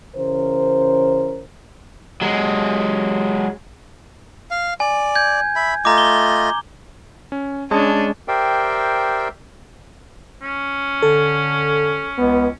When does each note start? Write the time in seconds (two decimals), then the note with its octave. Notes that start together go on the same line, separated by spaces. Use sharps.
0.15 C#3 E3 C#4 A#4 C5
2.21 F#3 G#3
4.51 F5
4.80 D5 G#5
5.15 G6 G#6
5.56 E5 B5
5.85 A3 F4 D#5 A#5 D6
5.98 G7
7.32 C#4
7.71 G#3 C#4 D4 A5 D#6
8.28 G4 A#4 C5 D5 E5 G5
10.43 C#4
11.02 D3 A4
12.18 C#2 B3